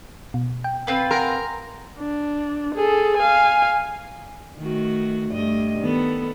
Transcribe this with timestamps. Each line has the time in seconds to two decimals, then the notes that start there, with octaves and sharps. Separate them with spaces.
0.34 B2
0.64 G5
0.87 C4 F4 B4
1.11 A#4 F#5 G#5 C6
1.99 D4
2.74 G#4 A4
3.17 F5 G#5
4.57 D#3 A3 F#4
5.32 G2 A3 D#5
5.79 D#3 B3 A4